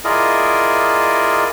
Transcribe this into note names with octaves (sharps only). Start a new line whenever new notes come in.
E4 F4 G#4 A#4 D5 D#5